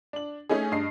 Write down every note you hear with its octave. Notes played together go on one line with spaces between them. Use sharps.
D4 F#7
A3 C#4 D#4 G#4
G2 D#5 C7